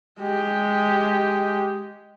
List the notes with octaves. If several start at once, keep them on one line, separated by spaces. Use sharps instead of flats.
G#3 G4